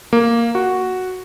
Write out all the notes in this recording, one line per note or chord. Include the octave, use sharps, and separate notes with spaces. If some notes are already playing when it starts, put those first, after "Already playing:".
A#3
F#4